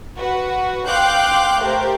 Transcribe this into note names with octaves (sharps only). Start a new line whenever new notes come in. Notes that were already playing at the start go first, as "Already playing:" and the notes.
F#4 B4
F5 G5 C6 D6 F#6 G6
A3 G4 A#4 C5